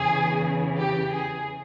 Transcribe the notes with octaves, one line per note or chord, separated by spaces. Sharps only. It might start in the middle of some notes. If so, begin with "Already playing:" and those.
Already playing: E2 C#3 E3 G#4
G4
G#4